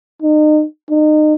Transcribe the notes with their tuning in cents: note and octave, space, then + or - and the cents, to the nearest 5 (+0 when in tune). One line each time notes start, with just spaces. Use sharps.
D#4 -35
D#4 -30